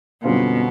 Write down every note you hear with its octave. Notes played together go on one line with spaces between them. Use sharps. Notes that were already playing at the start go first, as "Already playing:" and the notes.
F#2 B2 D3 G3 C4 F4